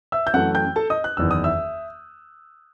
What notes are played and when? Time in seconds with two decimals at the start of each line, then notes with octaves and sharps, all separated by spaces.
0.12 E5 E6
0.27 G6
0.34 F#2 E3 A3 F#5 F#6
0.54 G5 G6
0.76 A4 A5
0.90 D#5 D#6
1.04 F#6
1.17 F#1 E2 D#3 E6
1.31 D#6
1.44 E5 E6